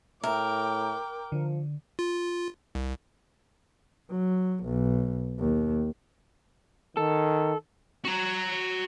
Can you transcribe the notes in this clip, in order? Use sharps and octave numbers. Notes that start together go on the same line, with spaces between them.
A2 A#4 E5 G5 A#5 D6
D3 F3
F4
C2
F#3
B1
D#2
D#3 A4
F#4 A#5